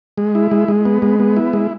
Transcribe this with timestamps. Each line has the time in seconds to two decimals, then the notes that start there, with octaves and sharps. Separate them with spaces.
0.18 G#3
0.35 E4
0.51 G#3
0.68 G#3
0.85 B3
1.02 G#3
1.20 B3
1.36 E4
1.53 G#3